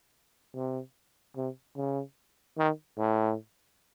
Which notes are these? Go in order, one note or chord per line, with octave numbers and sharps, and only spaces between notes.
C3
C3
C#3
D#3
A2